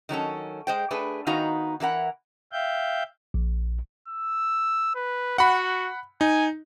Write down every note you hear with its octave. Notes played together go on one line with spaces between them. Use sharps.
D#3 F#3 C#4 A4
G#3 C5 G5
A3 D4 G#4 B4
D#3 B3 D#4 F#4 F5 A#5
E3 E4 A#4 F#5
E5 F5 G5 G6
A#1
E6
B4
F#4 F#5 B5
D#4 G#5